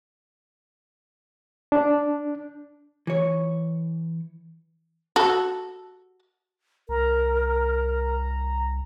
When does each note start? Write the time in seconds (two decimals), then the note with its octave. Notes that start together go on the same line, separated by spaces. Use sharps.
1.72 D4
3.07 E3 C#5
5.16 F#4 A4
6.89 C2 A#4 A#5